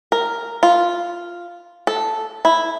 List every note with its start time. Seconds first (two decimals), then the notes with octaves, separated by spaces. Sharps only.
0.12 A#4
0.63 F4
1.87 A4
2.45 E4